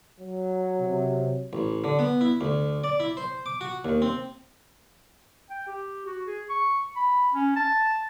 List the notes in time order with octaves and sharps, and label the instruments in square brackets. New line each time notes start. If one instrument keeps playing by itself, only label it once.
[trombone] F#3
[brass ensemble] C3
[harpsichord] A1
D3
B3
E4
D2
D5
E4
C5
D6
F#4
D#2
C4
[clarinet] G5
G4
F#4
G#4
C#6
B5
C#4
A5